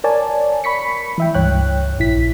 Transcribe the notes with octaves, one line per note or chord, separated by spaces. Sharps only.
A#4 C#5 D5 G#5 A5
B5 C#6 B6 C#7
E3 E5 G5
C#2 G2 C#5 G5 F#6
A#1 E4 B6